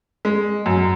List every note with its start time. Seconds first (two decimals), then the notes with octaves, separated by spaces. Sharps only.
0.25 G#3
0.66 F#2